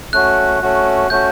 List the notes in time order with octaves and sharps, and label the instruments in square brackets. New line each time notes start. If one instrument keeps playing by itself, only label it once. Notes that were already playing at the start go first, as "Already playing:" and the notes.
[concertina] A3 C#4 F#4 [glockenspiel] F#6
[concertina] A3 C#4 F#4
[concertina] A3 C#4 F#4 [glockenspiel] G6